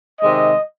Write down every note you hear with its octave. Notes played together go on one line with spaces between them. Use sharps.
C3 D#3 G#3 D#5